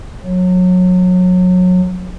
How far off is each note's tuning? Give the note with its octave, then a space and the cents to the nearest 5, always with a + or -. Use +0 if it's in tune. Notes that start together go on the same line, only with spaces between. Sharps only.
F#3 -25